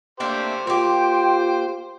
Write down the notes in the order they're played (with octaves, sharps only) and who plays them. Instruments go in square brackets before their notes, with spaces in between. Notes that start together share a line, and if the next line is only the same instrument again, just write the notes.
[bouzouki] A3 A#3 D4 [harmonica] G4 C5
[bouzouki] A#3 G4 [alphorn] F4 [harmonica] C5 [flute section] G5 C6